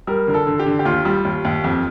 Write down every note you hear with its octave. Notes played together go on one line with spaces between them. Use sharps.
G3 A#4
D3 A#4
A4
D3
G4
D3
G4
D#2 F4
G3
D#2
D#2
F2